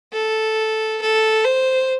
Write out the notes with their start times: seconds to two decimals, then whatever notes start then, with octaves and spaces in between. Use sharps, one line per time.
0.13 A4
1.02 A4
1.45 C5